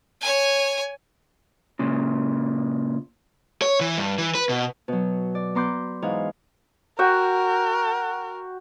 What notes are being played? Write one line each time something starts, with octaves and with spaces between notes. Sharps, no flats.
C#5 G#5
A#2 C#3
C#5
E3
G2
E3
B4
B2
B2 F#3
D5
B3 A#5 C6 D6 F#6 G6
G#2 E3 D#4 F5 F#5 G#5
F#4 A#4 E5 G5